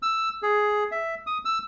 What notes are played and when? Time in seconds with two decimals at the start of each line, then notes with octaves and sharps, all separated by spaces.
0.02 E6
0.42 G#4
0.92 E5
1.27 D#6
1.45 E6